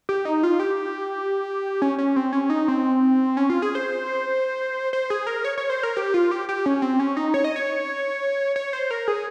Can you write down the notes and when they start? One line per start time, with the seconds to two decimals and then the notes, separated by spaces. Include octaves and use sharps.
0.09 G4
0.25 D#4
0.43 F4
0.60 G4
1.82 C#4
1.98 C#4
2.16 C4
2.33 C#4
2.50 D#4
2.68 C4
3.37 C#4
3.50 F4
3.62 G#4
3.75 C5
4.93 C5
5.10 G#4
5.27 A#4
5.44 C#5
5.58 C#5
5.70 C5
5.83 A#4
5.97 G4
6.14 F4
6.31 G4
6.49 G4
6.66 C#4
6.82 C4
7.00 C#4
7.17 D#4
7.34 C#5
7.44 D#5
7.56 C#5
8.56 C#5
8.73 C5
8.91 A#4
9.08 G#4